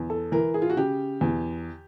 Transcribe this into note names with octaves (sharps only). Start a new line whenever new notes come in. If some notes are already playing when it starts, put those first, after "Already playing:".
Already playing: E2
A4
E3 A#4
G#4
F4
F#4
C#3 G4
E2